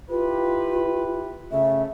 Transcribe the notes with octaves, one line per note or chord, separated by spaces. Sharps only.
E4 F4 G4 B4
C#3 A3 E5